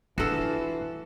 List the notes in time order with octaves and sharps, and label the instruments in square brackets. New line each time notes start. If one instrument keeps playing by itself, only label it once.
[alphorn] E3 [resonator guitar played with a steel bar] F3 A4 [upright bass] D4 [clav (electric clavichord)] F#4 G5